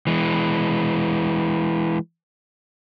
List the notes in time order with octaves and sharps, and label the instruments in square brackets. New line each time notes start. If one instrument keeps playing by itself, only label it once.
[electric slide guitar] E3 G#3